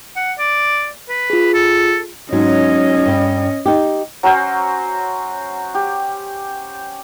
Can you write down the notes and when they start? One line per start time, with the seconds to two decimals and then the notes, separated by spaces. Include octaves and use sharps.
0.16 F#5
0.39 D5
1.09 B4
1.30 F4 G#4
1.54 A4
2.33 G#2 F#3 C#4 D#5
3.06 G2 G3
3.66 D#4 G4
4.23 F#3 C#4 F#4 C5
5.75 G4